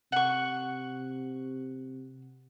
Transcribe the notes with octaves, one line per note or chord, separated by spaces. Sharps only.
C3 F#5 C#6